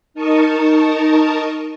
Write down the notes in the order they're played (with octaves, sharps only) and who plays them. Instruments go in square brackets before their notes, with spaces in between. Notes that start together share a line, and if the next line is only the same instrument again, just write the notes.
[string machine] D#4 A#4 A5 C#6 D#6